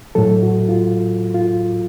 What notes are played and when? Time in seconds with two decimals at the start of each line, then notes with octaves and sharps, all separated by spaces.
0.15 A2 F#3 A4
0.43 F#4
0.69 F4
1.34 F4